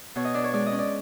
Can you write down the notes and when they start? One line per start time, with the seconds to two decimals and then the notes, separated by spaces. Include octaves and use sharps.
0.16 B2 C#5
0.25 D#5
0.34 D4 D5
0.44 C#5
0.53 G#3 D5
0.66 D#5
0.72 C#4
0.79 D5